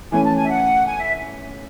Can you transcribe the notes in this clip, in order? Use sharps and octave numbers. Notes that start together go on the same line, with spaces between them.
E3 A3 C#4 G#5
A5
G#5
E5
F#5
G#5
E5